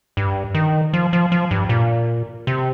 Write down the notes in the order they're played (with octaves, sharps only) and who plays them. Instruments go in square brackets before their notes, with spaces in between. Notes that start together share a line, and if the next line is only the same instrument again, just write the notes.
[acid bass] G2
D#3
F3
F3
F3
G2
A#2
C3